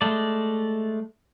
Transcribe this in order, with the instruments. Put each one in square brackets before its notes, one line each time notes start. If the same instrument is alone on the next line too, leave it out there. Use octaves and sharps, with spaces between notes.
[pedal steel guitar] G#3 A3 D5